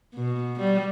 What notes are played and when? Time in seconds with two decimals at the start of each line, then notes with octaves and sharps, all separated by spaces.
0.15 B2
0.60 G3